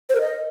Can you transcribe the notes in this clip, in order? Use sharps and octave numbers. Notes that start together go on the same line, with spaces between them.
C5
A#4
D#5